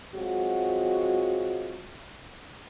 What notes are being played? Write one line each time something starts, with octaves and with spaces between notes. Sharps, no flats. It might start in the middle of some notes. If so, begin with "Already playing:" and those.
F#3 G#3 C4 F4 F#4